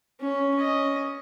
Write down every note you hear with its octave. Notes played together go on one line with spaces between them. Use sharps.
C#4
C#4 D#5